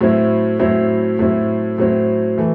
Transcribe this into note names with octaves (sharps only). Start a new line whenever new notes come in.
A2 F#3 C4 E4
A2 F#3 C4 E4
A2 F#3 C4 E4
A2 F#3 C4 E4
E3 A3